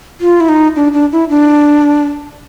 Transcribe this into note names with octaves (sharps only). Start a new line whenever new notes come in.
F4
E4
D#4
D4
D4
E4
D4